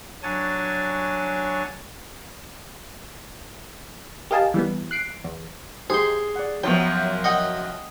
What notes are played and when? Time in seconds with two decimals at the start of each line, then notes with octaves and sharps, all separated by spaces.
0.23 F#3 D4 C#5 G#5 A6
4.31 G4 A#4 D#5 F5 G#5 A5
4.54 E3 G3 B3
4.91 F#6 C7 D7
5.24 E2
5.90 D#4 G4 G#4 C5 C6
6.36 D5 F#5
6.64 F#2 F3 F#3 B3 C5 G5
7.24 D#5 F#5 G5